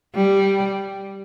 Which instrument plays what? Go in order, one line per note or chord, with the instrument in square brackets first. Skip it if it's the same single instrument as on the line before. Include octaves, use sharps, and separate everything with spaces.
[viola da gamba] G3